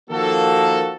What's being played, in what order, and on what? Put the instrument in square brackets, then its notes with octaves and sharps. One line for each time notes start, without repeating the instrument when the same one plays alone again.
[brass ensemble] D#3 F3 A#3 F#4 A4